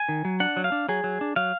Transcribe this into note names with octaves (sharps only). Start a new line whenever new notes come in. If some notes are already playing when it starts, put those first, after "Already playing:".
Already playing: G#5
D#3
F#3
D4 F#5
F#3
F5
D4
F#3 G#4
F#3
D4
F#3 F5